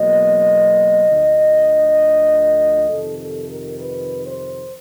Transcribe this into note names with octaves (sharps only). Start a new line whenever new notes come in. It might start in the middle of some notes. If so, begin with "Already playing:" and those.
Already playing: E2 B2 F#3 A#3 D#5
D2 D3 F3
F2 C3 D#3 A4
A4
A#4
B4
C5